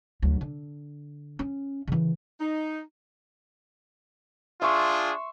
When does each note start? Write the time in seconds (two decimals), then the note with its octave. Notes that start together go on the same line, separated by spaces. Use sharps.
0.22 D2 F#3
0.41 D3
1.39 C#4
1.88 C#3 E3
2.40 D#4
4.62 D4 F4 G#4 E5 C6 C#6